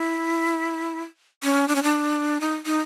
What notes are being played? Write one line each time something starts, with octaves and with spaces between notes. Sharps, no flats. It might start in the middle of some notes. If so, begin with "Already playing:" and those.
Already playing: E4
C#4
D4
C#4
D4
D#4
D#4